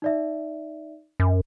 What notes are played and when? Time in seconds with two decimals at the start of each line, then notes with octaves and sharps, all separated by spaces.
0.02 D#4 D5 E5
1.20 F#2